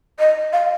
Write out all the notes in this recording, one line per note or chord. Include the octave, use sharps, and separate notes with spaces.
D#5
F5